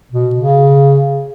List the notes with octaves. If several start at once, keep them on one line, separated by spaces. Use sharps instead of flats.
B2
C#3